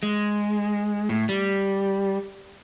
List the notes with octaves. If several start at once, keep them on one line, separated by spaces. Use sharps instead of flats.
G#3
A2
G3